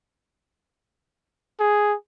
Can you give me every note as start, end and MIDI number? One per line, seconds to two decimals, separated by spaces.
1.60 1.95 68